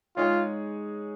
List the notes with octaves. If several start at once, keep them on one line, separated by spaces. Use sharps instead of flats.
G#3 D#4 F4 G#4 C#5